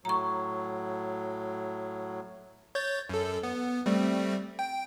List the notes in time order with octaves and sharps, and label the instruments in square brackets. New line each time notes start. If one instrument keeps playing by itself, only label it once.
[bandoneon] A2 F#3 [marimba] A#5 C#6
[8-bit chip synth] C#5 G6 A6
F#2 A4
B3
G3 A3 C4
G5